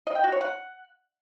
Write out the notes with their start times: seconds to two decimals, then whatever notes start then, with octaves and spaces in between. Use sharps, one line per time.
0.07 D#5
0.15 G5
0.24 F#4
0.32 C#5
0.41 F#5